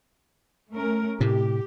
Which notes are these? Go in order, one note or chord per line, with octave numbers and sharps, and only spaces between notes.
A3 C#4 A#4
A2 C3 G4